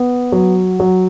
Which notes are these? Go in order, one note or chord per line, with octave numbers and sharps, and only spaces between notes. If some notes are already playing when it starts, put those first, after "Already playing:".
Already playing: B3
F#3
F#3